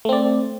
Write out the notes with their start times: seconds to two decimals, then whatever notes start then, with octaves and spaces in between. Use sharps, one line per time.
0.05 A3
0.09 C4
0.13 D5